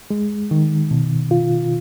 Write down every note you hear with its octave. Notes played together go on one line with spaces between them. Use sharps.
G#3
D#3
B2
F4